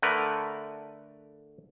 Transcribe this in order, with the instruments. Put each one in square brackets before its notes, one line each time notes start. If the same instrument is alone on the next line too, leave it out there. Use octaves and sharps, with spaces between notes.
[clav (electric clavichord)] D3 A3 A#4 B4